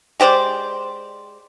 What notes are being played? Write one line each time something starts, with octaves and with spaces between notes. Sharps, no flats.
G#3 G4 C5 D5